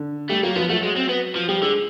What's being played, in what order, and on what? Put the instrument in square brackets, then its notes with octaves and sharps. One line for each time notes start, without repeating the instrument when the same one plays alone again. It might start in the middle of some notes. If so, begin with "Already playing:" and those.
Already playing: [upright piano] D3
[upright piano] G3 G4 [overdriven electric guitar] A3
[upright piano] F#3 F#4 [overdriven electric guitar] A#3
[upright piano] F3 F4 [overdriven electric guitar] B3
[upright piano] F#3 F#4 [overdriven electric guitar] A3
[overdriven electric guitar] G#3
C4
B3
F3
[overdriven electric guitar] F3 [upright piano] G3 G4
[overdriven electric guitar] D3 [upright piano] G#3 G#4